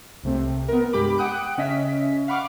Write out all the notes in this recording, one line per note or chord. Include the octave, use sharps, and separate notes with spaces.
C2 C3 A3 C4
B3 A#4
G2 G#3 G4 B5 D6
F#5 G5 D#6 F#6 D7
C#3 C#4 D#5 E5 B6
F5 F#5 B5 C#6 D6 F6